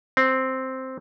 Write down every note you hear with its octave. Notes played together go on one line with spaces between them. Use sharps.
C4